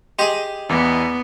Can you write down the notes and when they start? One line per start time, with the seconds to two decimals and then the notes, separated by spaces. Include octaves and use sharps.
0.19 G4 G#4 D#5 C6 D#6
0.69 E2 E3 B3 D6